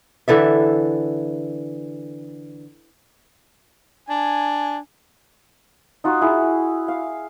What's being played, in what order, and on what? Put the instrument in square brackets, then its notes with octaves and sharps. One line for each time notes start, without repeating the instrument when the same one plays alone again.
[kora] D3 E3 A4 E5
[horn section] D4 G#5
[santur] D#4 F4 F#4
E4 G#4
F5